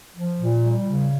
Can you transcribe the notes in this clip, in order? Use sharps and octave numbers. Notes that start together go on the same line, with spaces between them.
F3
A#2
G3
C#3